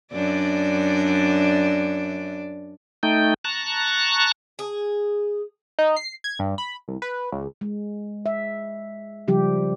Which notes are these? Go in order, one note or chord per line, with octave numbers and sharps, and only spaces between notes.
F#2 D4 D5
A3 D#4 G5
A5 A#5 C#6 F#6
G#4
D#4
C7
G#6
G2
B5
C2
B4
C#2
G#3
E5
C#3 F3 G3 G4